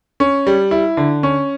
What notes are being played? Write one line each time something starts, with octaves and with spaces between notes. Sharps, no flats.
C#4
G3
E4
D3
C#4